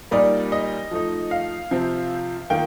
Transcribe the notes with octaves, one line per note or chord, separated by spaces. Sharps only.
A#2 G3 A#3 D#4 D5
D#5
F3 A3 D#4
F5
C3 F3 C4 F4
D#3 A#3 F4 G5